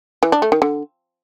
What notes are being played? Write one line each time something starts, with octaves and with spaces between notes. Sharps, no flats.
E3
D4
A3
D#3
D3